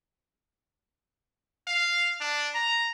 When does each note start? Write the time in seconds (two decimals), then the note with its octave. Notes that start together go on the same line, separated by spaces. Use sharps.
1.67 F5
2.21 D4
2.55 A#5